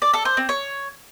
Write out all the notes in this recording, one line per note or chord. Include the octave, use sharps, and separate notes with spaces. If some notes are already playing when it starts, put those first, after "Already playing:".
D5
A4
C5
C4
C#5